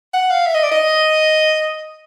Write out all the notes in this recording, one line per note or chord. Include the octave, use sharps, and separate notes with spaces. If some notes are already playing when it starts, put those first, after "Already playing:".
F#5
F5
E5
D#5
D5
D#5